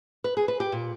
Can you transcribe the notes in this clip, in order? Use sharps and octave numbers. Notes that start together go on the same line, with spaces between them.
B4
G#4
B4
G4
A#2